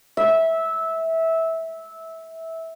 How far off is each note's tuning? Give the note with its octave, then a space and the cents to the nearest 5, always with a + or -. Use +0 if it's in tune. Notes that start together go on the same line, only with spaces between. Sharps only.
E5 -15